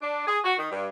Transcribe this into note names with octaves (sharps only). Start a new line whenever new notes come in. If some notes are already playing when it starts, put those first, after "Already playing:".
D4
G#4
F#4
D#3
G2